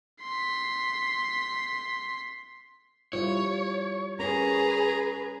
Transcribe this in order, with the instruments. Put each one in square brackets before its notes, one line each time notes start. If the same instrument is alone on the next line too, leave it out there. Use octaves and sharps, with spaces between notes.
[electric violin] C6 B6
[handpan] G3 E4 F4 [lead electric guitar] C#5
[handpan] C#4 A#4 [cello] G#4 B4 [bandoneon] A#5